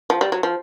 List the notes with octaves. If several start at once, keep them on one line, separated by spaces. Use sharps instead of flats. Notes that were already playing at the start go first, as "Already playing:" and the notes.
F3
G3
F#3
F3